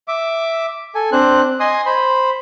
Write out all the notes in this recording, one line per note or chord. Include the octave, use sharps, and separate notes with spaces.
E5 D6
A4 G#5
C4 D4 C5 F#6
D#5 G#5 C6 D#6
C5 B5